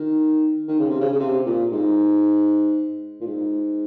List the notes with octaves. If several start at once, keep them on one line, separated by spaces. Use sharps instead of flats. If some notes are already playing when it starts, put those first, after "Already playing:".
Already playing: D#3
D#3
C#3
C3
C#3
C#3
C3
A#2
G#2
A#2
G#2